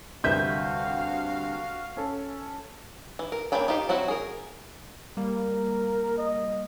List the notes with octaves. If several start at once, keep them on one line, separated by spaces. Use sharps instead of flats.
D2 G2 C3 F#4 B4 E5 F5 G6
C#4 A4
E3
A#4
A#3 C#4 D4 G5 B5
D#4 F4 G4 C5
F#3 C4 E4 F#4 C5
G#4 A#4
G3 A#3 A#4
D#5